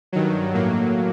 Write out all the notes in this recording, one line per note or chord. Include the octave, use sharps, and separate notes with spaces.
G2 D#3 F#3
A2 F#3 A#3